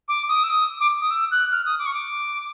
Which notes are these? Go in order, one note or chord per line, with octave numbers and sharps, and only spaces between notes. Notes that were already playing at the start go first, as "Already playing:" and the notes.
D6
D#6
E6
D#6
D6
D#6
E6
F#6
F6
D#6
D6
C#6
D6